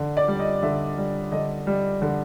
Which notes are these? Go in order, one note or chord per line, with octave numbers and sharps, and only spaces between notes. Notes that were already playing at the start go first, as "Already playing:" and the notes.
Already playing: D3
D5
G3
D#5
D3 E5
G3
D3 D#5
G3
D3